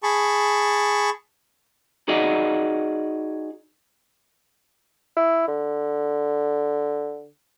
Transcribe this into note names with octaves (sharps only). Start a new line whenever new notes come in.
G#4 A5 B5 C#6
D#4 F#4 G#4 D5 D#5 F#5
E4
D3